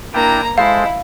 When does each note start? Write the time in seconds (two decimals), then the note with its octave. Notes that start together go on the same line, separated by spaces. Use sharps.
0.14 A#3 D4 E4 G5 A#5
0.58 G#3 E4 A4 C5 F5